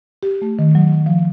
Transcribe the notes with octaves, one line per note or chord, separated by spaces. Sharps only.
G4
A3
D#3
F#3
F3